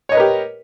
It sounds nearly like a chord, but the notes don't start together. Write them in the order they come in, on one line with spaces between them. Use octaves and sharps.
C#5 D#5 B4 A#4 G4